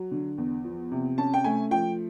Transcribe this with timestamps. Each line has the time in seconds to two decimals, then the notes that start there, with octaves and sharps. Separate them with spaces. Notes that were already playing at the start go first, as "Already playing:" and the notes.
Already playing: F#3
0.11 D3
0.38 E2
0.65 F3
0.91 C3
1.18 C#4 A5
1.34 G5
1.44 A3 G#5
1.71 F3 G5